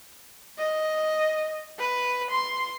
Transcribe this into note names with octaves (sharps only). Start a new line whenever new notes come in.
D#5
B4
C6